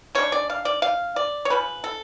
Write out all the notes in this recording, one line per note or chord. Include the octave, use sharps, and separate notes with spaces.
C#3 G#3 D4 C#5
D5
F5
D5
F5
D5
C#5
C#3 F3 B4
A4